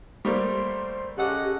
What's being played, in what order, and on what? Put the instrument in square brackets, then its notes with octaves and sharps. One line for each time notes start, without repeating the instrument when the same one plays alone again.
[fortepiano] G3 A3 A#3 [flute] C5
[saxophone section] C#3 A4 F#5 [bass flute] G4 [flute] D#5